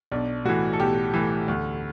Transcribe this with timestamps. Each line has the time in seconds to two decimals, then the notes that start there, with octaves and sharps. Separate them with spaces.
0.12 B1 D4
0.45 A2 E3 F#4
0.73 A4
0.80 B1 G4
1.14 A2 E3
1.48 D2